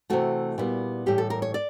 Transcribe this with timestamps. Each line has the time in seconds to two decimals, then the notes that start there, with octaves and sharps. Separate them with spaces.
0.10 C3 E3 A3 F#4
0.58 A#2 G3 B3 E4
1.06 A2 E3 G3 G4
1.18 A4
1.30 A#4
1.42 C#5
1.54 D5